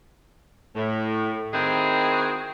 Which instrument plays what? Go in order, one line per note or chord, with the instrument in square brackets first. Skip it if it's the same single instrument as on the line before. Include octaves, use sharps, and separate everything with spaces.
[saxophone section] A2
D#3 C4 D#4 E4 F#4 G#4